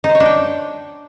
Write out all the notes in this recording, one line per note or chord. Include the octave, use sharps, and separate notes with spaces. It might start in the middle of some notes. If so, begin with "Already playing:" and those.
D#4
C5
C#5
D4
G5